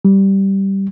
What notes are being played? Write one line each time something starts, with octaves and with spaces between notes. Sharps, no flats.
G3